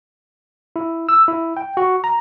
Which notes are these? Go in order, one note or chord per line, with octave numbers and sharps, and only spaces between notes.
E4
E6
E4
G5
F#4
A#5